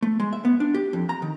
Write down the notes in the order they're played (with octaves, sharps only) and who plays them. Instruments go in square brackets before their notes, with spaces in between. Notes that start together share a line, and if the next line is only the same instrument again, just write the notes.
[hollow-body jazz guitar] A3
G#3
E5
B3
D4
G4
F2
A#5
D#3